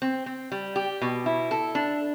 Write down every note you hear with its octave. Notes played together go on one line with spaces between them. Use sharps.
C4
C4
G3
G4
B2
E4
A4
D4